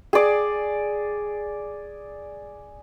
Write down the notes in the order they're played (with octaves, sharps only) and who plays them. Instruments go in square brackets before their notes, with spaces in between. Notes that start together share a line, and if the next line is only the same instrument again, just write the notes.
[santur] G#4 D5